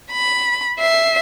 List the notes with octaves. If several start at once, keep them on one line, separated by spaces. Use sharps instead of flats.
B5
E5 C7